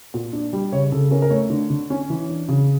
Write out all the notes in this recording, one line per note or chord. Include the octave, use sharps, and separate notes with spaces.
A#2
D4
G3
C#3 C#5
C#3 A4
C#4 A#4
A#4
A3 C#5
D3
D3
C#4
E3
D4
C#3